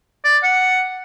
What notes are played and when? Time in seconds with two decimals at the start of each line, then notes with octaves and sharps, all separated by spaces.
0.25 D5
0.43 F#5